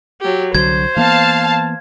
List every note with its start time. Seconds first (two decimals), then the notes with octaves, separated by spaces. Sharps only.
0.21 F#3 G4
0.55 C2 D3 F#3 C5 G#6
0.97 E3 A#3 B3 F5 A5